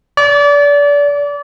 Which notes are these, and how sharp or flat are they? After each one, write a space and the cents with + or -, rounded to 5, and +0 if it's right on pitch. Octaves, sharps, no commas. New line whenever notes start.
D5 -30